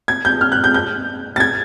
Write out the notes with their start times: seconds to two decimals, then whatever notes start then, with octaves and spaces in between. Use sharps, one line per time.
0.08 G#6
0.25 G6
0.41 F6
0.52 F#6
0.64 G6
0.74 G6
1.36 A6
1.40 G#6